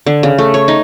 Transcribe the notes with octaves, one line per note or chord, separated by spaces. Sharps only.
D3
C#3
A3
C#5
D#4